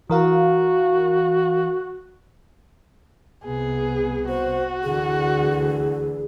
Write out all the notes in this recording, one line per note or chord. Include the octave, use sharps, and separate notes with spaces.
E3 F#4 A#4 F5
C2 C3 B3 G#4
F#4 C5
D2 D3 E3 G#4